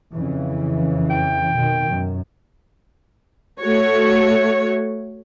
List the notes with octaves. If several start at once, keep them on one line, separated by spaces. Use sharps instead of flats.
F2 C#3 E3
G5
B2 D#3
F#2
A3 F#4 C#5